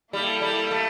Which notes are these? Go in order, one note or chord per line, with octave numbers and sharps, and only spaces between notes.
G3 A#3 E4 A4
G3
A3